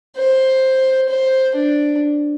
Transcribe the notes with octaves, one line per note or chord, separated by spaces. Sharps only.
C5
C5
D4